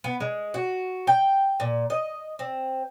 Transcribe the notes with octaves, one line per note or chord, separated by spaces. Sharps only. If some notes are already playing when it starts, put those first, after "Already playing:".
B3
G#3
F#4
G5
A#2
D#5
C4